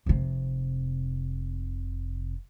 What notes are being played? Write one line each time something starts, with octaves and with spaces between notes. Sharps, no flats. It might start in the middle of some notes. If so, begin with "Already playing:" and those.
F1 C3